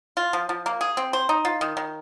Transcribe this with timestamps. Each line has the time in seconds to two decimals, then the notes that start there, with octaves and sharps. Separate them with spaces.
0.17 F4
0.33 F3
0.49 F3
0.66 A#3
0.81 G#4
0.97 C4
1.13 C5
1.29 D#4
1.45 F4
1.61 D#3
1.77 D#3